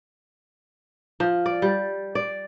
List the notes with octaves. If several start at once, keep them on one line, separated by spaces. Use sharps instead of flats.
F3
D5
G3
D5